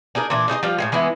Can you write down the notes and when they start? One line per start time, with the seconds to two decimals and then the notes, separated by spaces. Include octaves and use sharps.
0.15 D4 D#4 G#4 A#4
0.30 A#2 E3 D4
0.48 D#4 G#4 C5 D#5
0.63 F3 G3 F4
0.78 A2 C#3 G#3
0.92 E3 G#3 B3 E4